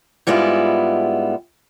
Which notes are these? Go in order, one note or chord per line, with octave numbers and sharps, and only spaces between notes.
G#2 G3 G#3 B3 E4 F4